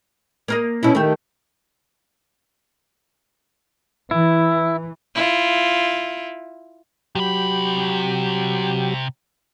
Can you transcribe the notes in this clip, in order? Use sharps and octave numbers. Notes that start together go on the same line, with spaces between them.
A#3 A#4 D#5
B2 C#4 E4
D#3 A3 G4
E3 E4
E4 F4
C3 F#3 G4 B5